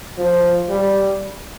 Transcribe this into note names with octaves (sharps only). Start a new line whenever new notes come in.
F3
G3